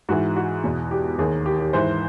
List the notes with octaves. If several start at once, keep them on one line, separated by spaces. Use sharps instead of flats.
G#2 E3 F#4
F#4
E2 B2
G4
D#2 D#3 G#4
G4
G4
G#2 E3 C5